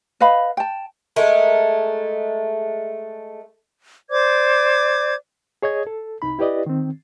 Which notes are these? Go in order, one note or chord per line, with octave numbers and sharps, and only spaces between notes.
B4 D#5 F5 B5
G5 A5
G#3 A3 A#4
C5 D5 D6 G#6
G#4 C#5 D#5 G#6
A4
C2 D#4 B5
E4 G4 B4 D5 D#5
D#3 C4